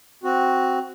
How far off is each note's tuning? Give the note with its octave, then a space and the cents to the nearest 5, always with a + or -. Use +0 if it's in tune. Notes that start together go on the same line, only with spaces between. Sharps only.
C4 +0 F#4 +0